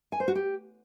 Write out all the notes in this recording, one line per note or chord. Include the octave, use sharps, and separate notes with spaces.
G#5
C5
F#4
G4